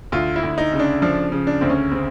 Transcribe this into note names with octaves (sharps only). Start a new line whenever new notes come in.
D2 F4
E4
D2
D#4
C#3
D4
F3 D4
C#3
D4
D2 C4
C#4
C#3 C4